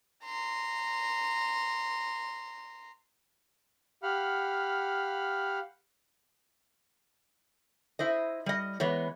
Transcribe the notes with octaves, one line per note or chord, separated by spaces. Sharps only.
A#5 C6
G4 F5 F#5 B5 F6
E4 C5 D#5
G3 D#5
E3 G#3 B3 C#5